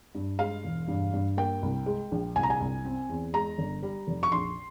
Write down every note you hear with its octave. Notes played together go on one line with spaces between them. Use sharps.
G2
G#3 F5
E1
G2
G2
A#3 G5
C2
G#3
A#1
C2 G#5
A#5
G#5
C2
C4
E2
G#3 A#5
G1
G3
F1
C#6
A#1 C6